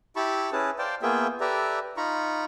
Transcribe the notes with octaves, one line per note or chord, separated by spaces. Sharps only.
E4 G4 A5 B5 C#6
C#4 E4 G#4 B4 A5
C5 D5 F5 G5 A5
A#3 B3 F4 G#4 E5 G5
G4 A4 B4 D5 E5 A#5
D#4 F4 A#5 B5 C#6